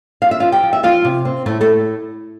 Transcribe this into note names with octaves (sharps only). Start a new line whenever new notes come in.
F3 F5
E5
F3 F4 F5
G4 G5
F3
E5
F3 F4 F5
C3
C4
A2 A3 A4
A3 A4